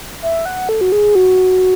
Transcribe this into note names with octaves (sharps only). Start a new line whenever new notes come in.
E5
F#5
A4
F#4
G#4
F#4